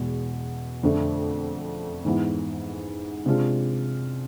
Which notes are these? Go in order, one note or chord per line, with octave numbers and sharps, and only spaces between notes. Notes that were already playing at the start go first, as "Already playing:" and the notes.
Already playing: E2 B2 G#3
F2 D3 A3
G#2 E3 B3 E4
C3 G#3 D4 F4